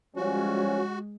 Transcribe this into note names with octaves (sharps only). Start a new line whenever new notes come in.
F3 G3 G#3 C#4 F#4